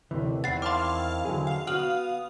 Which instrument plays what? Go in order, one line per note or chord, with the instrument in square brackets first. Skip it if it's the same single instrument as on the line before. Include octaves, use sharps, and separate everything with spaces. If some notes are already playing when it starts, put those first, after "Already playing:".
[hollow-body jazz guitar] D2 C3 E3 [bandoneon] A2 D#3
[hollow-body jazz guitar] E2 F#5 [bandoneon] D#3 C4 E4 [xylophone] A6 C7
[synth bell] F5 A5 F6 [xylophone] C6 D6
[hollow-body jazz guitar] D3 F#3 G#4
[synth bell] F5 F7
[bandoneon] B3 D#6 [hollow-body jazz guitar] F#4 [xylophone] F6 F#7